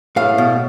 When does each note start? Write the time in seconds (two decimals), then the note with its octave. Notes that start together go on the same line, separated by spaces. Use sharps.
0.16 A2 F5
0.38 B2